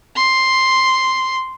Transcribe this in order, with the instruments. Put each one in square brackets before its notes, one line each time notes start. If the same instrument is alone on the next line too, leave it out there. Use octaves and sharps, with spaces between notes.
[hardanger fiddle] C6